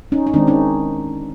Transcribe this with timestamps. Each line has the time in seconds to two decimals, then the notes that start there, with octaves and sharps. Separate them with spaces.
0.12 C#4 D#4
0.27 D#4
0.33 D#3 G#3 C4 D4
0.47 C#4 D#4